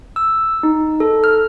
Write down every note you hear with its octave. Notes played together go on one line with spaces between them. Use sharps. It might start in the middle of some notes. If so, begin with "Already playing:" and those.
E6
D#4
A4
F6